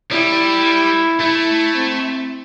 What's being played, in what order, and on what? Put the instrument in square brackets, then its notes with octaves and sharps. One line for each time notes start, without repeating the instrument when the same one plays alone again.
[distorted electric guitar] G3 [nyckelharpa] E4
[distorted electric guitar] A3 [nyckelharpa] E4
[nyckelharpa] C4